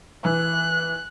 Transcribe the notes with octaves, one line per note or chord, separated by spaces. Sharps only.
E3 F#6